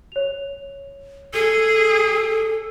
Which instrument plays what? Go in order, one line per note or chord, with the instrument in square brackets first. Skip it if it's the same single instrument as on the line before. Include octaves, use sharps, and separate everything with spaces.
[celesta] C#5 F7
[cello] G#4 [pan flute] A4